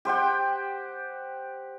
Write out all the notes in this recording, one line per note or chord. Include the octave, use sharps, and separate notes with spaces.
G4 C5 F#5 G5